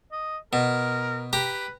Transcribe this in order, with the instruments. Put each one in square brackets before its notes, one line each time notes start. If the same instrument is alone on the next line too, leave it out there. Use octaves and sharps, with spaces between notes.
[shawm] D#5
[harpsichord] B2 [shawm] A#4
[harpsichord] G4 A#5 [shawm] B4